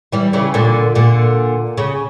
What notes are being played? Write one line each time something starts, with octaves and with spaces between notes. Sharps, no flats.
E3 G3
C#3 E3
A#2 D3
A#2 D3
C#3